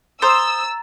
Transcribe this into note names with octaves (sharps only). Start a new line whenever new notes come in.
C5 A#5 D#6 E6 A6